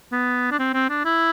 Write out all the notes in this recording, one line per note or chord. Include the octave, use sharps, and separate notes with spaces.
B3
D4
C4
C4
D4
E4